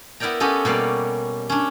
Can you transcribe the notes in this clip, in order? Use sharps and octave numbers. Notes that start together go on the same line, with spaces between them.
B3 E4 A#4 D5 G5 A#5
B3 C#4 G4 A4 D#5
B2 G3 A#3 C#4 D5
C#4 D4